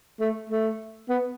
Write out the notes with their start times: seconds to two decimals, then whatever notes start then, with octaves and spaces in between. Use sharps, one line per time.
0.20 A3
0.50 A3
1.09 B3